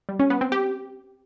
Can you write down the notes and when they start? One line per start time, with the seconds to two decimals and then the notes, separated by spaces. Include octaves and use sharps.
0.09 G3
0.19 C#4
0.30 B3
0.41 C4
0.52 G4